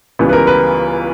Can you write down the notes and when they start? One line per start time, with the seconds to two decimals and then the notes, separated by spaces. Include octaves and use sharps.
0.19 C#2 C#3 E3 G3 B3
0.29 B4
0.33 A#4
0.47 B4